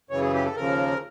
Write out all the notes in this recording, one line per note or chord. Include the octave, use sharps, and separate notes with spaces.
F#2 C#3 E3 C#5
G#4
G4
A4
D#2 C#3 F3 A#4